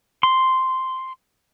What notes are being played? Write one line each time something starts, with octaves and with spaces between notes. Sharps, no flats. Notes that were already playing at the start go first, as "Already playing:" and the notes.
C6